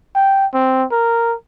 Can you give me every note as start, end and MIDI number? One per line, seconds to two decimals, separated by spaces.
0.15 0.46 79
0.53 0.85 60
0.91 1.34 70